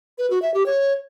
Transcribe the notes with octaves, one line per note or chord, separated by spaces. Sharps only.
B4
F#4
E5
G4
C#5